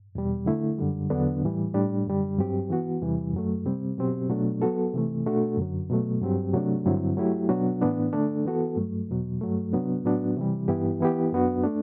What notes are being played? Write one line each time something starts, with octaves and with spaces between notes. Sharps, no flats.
E2 B2 G3
D3 A3 E4
F#2 D3 G3
E2 D3 F#3 B3 D4
A2 E3 G3
A2 G3 D4
F#2 D3 G3
G2 F#3 C4 G4
E3 B3 F#4
E2 C3 E3 G3
F#2 F#3 A3
C3 G3 C4
B2 F#3 C4 G4
B2 F#3 A3 D4
F#3 B3 F#4 A4
C3 E3 A3
B2 A3 D4 F#4 A4
F#2 D3 F#3
B2 F#3 A3
G2 F#3 C4 G4
C3 F#3 A3 D4
G2 D3 F#3 C4 E4
F#3 A3 E4 G4
B2 F#3 B3 D4 F#4
A2 E3 B3 D4
D3 A3 D4 A4
E3 B3 F#4 A4
G2 F#3 A3
E2 B2 F#3
G2 F#3 A3
C3 F#3 B3 D4
A2 F#3 B3 D4 F#4
C3 E3 G3
G2 E3 B3 E4 G4
E3 B3 E4 G4
F#2 F#3 B3 D4 F#4
A3 D4